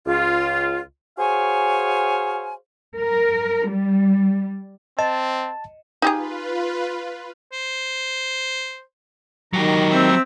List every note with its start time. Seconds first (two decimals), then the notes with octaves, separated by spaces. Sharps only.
0.06 C#2 F4
1.18 F#4 G#4 C5 C#5 F5 G#5
2.98 A#4
3.69 G3
4.99 C4 D#5 A5
6.02 D#4 F4 G4 G#4 B4
7.53 C5
9.53 D#3 F#3 G4 A#5
9.91 C4 E5